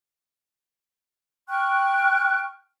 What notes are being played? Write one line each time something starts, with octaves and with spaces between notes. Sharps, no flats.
G5 C#6 F6 F#6